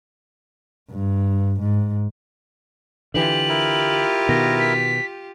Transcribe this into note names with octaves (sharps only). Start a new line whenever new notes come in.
G2
G#2
D3 E3 F4 G4 F#7
E4 A#4
B2 D#3 A#6
B6